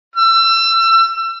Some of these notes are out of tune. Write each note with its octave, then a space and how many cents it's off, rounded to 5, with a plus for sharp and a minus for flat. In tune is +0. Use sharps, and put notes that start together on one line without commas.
E6 +30